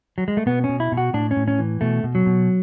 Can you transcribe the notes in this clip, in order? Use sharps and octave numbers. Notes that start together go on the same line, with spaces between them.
F#3
G#3
A3
B2 B3
C#4
B2
E4
B2
F#4
A2 D4
C#4
A2
C#4
E3
B2 A3
B2
F#3
B2